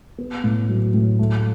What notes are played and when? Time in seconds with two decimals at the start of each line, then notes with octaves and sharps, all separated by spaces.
0.18 B3
0.44 A2
0.69 F#3
0.94 A2
1.19 A3